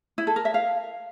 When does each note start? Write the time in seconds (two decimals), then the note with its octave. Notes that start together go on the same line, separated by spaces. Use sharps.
0.18 E4
0.27 A4
0.36 A#4
0.45 E5
0.54 F5